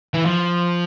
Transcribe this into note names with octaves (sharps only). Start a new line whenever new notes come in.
E3
F3